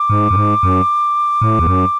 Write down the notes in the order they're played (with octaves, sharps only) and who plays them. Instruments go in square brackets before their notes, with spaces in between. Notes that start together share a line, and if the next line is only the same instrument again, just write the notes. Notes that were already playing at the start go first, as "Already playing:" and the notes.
Already playing: [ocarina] D6
[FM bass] G#2
F#2
G#2
F#2
A2
E2
F#2